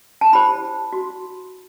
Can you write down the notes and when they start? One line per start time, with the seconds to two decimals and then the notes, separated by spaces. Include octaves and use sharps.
0.21 A5
0.32 E4 G4 C5 B5
0.93 F#4